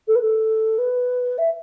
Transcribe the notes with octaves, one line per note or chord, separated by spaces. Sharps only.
A4
B4
A4
B4
E5